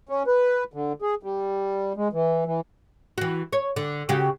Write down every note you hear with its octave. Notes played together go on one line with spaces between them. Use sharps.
C#4
B4
D3
G#4
G3
G#3
E3
E3
E3 F#4
C#5
D3
C#3 F#4 G4